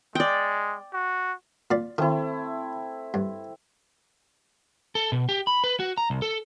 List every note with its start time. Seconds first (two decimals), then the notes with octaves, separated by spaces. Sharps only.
0.15 G#3 D5 G5
0.93 F#4
1.71 A#2 D5
1.98 D#3 A3 C4 E4
3.14 G2
4.95 A4
5.12 B2
5.29 G4
5.47 B5
5.64 B4
5.80 F#4
5.97 A#5
6.10 C2
6.22 A4